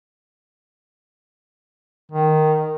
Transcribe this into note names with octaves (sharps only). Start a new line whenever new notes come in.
D#3